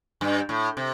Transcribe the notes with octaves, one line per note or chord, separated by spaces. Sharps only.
G2
A2
C3